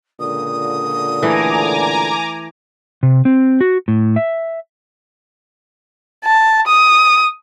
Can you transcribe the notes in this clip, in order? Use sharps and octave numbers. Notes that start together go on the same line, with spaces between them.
C#2 A#2 D3 D#6
E3 A3 G#5 A#5 D6
C3
C4
F#4
A2
E5
A5
D#6